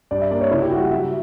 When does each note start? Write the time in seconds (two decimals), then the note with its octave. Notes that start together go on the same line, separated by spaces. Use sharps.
0.11 G2 D5
0.21 E5
0.31 A#3 D5
0.41 C#5
0.51 C#3 E4
0.63 G4
0.71 G3 F#4
0.91 F#3 E5